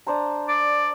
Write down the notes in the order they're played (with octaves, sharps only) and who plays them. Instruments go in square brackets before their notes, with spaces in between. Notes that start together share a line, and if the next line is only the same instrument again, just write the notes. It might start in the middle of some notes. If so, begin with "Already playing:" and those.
[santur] D4 C5 A#5
[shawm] D5